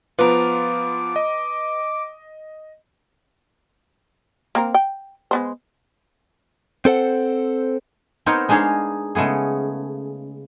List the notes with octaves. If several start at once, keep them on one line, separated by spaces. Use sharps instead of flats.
F3 B3 F4 B4 A#5 D6
D#5
A#3 C4 A#4
G5
G#3 B3 C5
C4 A4 C5 F#5
B3 C4 D#4 A#4 C5 C#5
G#3 D4 D#4 G#4 C#5 F5
C#3 G#3 A3 B3 G#4